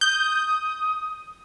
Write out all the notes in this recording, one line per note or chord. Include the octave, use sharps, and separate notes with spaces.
D#6 G6